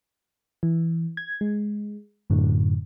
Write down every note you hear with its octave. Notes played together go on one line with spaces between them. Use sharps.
E3
G#6
G#3
F#2 A2 D3